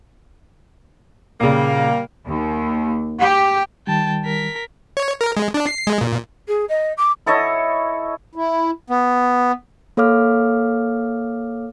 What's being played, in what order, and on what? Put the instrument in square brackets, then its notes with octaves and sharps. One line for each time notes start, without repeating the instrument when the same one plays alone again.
[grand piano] A#2 C#3 [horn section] G3 A#3
[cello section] D#2
G4
[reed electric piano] D#3 G3 [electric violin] G5 A5
[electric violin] A#4 B6
[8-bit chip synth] C#5
A#4
G#3
D4
C7
G#3
A#2
[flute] G#4
D#5
D6
[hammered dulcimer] E4 A4 C#5 D#5
[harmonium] E4
[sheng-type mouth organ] B3
[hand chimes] A#3 A4 C#5 F5 D6 F6